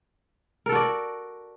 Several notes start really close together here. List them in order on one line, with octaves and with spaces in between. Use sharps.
A#4 A4 F#4 D5